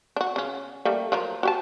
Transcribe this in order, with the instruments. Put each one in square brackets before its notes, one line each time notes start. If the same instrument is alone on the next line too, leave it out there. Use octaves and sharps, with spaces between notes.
[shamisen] D4 F#4
C#3 C#4
G3 A3 A#3
F3 F#3 A#4
F#4 G4 A5